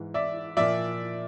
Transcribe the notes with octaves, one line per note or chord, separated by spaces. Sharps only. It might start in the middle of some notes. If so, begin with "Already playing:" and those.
Already playing: G#2 E3
D5 E5
A#2 F3 D5 E5